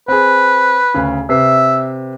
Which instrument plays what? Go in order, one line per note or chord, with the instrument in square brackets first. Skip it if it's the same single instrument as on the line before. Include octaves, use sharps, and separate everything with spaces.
[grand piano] C4 G#4 [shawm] B4
[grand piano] D2 C#3
[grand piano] C3 B4 C7 [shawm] E5